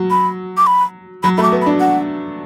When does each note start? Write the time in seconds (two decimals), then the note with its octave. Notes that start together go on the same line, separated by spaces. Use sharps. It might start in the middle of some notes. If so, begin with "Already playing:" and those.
Already playing: F#3
0.10 B5
0.57 D6
0.67 B5
1.23 F#3 B5
1.37 A3 B5
1.43 D6
1.52 B3
1.62 B5
1.66 D4
1.80 F#5